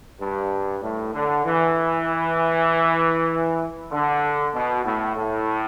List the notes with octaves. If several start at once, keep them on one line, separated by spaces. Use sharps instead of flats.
G2
A2
D3
E3
D3
B2
A2
A2